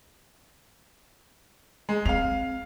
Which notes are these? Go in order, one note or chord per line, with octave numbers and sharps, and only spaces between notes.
G#3
C4 F5 F7